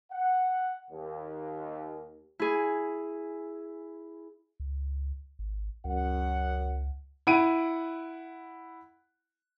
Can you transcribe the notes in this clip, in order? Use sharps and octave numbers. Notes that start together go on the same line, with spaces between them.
F#5
D#2
E4 G#4
C#2
G#1
C#2 F#2 F#5
E4 F#5 D7 D#7